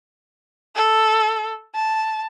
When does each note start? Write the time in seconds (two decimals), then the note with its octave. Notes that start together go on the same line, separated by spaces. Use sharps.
0.75 A4
1.75 A5